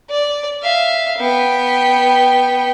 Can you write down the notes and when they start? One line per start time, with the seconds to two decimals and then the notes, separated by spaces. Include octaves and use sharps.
0.10 D5
0.62 E5 F5
1.19 B3 G5